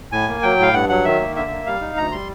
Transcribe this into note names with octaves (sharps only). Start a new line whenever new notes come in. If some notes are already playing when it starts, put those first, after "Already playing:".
A2 G#5
A#3
F#3 G5
A2 F5
G2 F#5
F#3 F#5
D#3 E5
A#3
D3 E5
A#3
G3 F5
D#4
D2 A#5
G3 C6